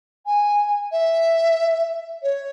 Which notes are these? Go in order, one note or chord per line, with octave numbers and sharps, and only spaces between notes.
G#5
E5
C#5